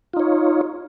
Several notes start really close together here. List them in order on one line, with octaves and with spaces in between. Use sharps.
F4 D#4 C#5